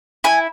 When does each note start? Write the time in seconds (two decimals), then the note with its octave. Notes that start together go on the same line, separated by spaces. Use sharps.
0.24 E4 G#5